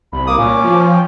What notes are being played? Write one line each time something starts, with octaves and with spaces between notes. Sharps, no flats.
C2 B5
A#3 D6 D#6
A#2 C#4
F3
G5